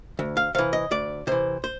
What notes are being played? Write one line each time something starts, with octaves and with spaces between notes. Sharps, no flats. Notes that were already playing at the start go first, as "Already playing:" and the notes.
D2
F5
C3 E3 F5
D#5
D2 D5
C3 E3 C5
C5